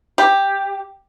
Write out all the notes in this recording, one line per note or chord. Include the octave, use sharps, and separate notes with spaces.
G4